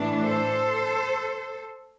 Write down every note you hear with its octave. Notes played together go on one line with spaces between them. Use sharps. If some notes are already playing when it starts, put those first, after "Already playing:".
Already playing: A2 E3 A3 D4
A4 C5